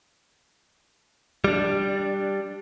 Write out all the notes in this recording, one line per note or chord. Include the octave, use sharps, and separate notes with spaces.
G3 D4